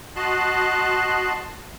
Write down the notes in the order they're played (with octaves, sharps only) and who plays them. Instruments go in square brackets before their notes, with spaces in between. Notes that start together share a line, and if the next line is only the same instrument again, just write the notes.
[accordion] F#4 D#5 A5 C6 F#6